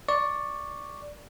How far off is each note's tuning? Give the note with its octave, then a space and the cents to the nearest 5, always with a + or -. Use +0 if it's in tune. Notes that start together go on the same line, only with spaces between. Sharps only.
D5 +0 C#6 +0